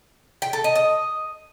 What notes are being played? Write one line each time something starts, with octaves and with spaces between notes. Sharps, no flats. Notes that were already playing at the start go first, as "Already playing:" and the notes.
G5
A4
D#5
D#5